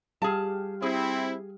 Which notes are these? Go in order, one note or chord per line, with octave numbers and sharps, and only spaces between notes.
G3 G4 G#4 F5 A5
C4 E4 G#4